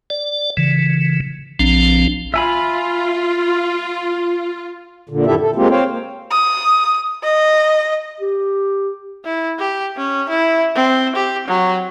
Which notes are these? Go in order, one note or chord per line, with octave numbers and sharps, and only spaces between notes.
D5
C#3 E3
A#1 F3 C4 D4
F4 E5 G#5 B5
A#2 D3
F#2 D#3 E4 G4 A4 E5
A4
G#3 A#3 C4 F4 G4
C4 C5 C#5 F5 G5
A#3
D#6
D#5
G4
E4
G4
C#4
E4
C4
G4
F#3